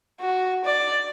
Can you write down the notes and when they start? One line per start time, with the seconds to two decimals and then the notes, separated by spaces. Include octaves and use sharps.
0.20 F#4
0.65 D5